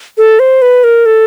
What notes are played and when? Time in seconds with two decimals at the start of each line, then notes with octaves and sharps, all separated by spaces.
0.18 A4
0.39 C5
0.62 B4
0.84 A#4
1.06 A4